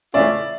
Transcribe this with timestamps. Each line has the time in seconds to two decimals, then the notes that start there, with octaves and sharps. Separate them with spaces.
0.14 C#3 E3 A3 C#4 F4 D5 E5